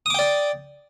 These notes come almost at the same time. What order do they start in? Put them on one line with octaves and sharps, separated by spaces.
D#6 D6 G5 D5